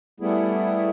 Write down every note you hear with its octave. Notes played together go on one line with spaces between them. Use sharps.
G3 A3 B3 E4 G#4